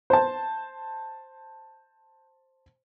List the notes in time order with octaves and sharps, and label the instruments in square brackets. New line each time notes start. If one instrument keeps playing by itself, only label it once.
[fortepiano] C5 A5